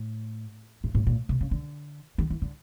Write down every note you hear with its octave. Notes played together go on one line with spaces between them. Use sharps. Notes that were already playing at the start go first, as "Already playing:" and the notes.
Already playing: A2
A2
A2
A#2
C3
C#3
D3
D#3
E3
D3